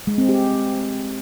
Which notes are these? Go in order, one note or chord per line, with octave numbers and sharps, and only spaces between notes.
G#3
C4
G4